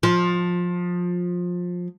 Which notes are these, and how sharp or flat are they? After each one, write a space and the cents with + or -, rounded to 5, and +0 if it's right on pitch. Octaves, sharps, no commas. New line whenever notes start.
F3 +20